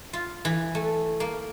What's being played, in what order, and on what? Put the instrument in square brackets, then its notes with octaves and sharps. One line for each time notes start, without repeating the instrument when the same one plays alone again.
[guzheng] F4
E3
A3
A#3